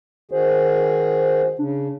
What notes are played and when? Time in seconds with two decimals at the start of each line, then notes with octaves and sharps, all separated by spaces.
0.31 D#3 F#4 G#4 C5
1.59 C#3 D4